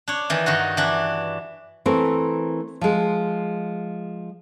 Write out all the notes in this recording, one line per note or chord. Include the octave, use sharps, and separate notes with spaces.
D4 C#5
D#3 E3
G2 D#3 D#4 F#4
E3 D4
E3 A3 C4 A#4
F3 G#3